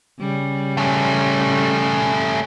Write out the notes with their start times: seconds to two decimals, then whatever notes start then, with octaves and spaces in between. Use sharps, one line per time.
0.20 C#3 G3
0.77 A3 C#4